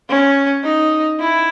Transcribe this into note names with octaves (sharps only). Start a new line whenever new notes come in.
C#4
D#4
E4